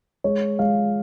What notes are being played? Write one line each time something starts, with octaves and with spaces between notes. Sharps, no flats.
G#3 C#5
G#3 F5